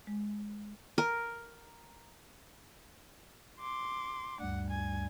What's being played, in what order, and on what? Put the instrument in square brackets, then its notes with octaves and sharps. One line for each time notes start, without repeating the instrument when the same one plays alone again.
[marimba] G#3
[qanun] A#4
[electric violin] C6 D6
[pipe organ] D2 G2 G3 [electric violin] F#5
[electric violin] G#5